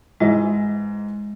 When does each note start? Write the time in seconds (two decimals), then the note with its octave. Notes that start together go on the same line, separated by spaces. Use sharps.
0.20 G#2 E3 G#3 D#5